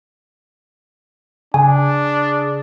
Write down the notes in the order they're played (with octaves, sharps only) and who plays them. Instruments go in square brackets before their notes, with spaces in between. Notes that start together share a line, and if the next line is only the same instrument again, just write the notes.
[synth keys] C#3 [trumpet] D4 [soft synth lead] G#4 [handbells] G#5